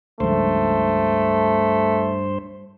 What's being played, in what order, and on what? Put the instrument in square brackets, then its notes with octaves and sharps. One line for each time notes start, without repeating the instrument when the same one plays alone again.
[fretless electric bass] C#2 F3 [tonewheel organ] G2 C5 [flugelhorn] A3